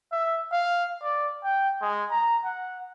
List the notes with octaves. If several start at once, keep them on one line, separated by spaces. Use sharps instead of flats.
E5
F5
D5
G5
G#3
A#5
F#5